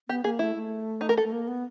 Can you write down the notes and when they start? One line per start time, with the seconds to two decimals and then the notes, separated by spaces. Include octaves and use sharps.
0.09 B3 G4
0.24 A#3 G#4
0.39 A3 E4
0.55 A3
1.01 D#4
1.09 A#4
1.17 A4
1.24 A3
1.32 A#3
1.48 B3